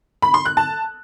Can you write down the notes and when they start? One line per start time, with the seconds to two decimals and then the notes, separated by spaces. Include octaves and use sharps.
0.22 B5
0.34 C6
0.45 F#6
0.57 A5